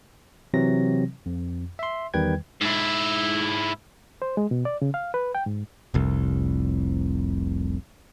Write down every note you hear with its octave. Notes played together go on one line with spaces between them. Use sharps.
C3 E3 F#3 C4 A#6
F2
E5 C6
E2 D#3 G3 B4 G5 G#6
G#2 E4
C5
G#3
B2
D5
C#3
F5
B4
G5
G#2
F1 C2